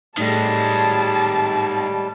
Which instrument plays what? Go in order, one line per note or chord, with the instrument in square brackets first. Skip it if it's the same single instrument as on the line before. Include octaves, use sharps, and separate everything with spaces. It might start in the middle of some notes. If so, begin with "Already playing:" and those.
[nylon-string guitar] A2 G4 A4 [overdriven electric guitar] D#3 G#3 [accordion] G3 [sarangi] A5